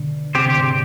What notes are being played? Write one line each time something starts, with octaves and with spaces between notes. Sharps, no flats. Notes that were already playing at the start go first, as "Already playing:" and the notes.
Already playing: B2 D3
C3 C4 G4 C5
D3
G#2 C3